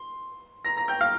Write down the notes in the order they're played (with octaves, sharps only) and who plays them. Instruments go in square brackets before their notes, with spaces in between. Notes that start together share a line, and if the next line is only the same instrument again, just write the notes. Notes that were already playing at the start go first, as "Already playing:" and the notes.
Already playing: [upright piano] C6
A#5 A#6
A#5 A#6
G5 G6
F5 F6